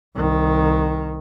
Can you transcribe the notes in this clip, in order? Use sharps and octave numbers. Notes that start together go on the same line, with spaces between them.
C2 D#3